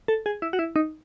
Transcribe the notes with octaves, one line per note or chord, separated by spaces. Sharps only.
A4
G#4
E4
F#4
E4
D#4